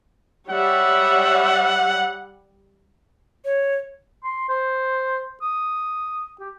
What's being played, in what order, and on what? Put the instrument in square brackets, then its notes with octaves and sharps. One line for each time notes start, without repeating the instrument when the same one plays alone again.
[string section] G3 [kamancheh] C#5 E5 [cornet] F#5
[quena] C#5
[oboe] C6
C5
D#6
G4